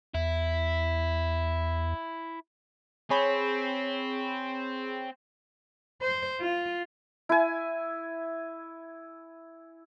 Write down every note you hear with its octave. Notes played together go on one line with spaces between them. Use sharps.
E2 E4
C4 G#4 C#5 B5
C5
F4
E4 G#5